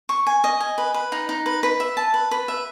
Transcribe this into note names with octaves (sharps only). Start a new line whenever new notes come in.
C#6
G#5
D#5
G#5
B4
B4
D#4
D#4
B4
B4
E5
A5
B4
B4
E5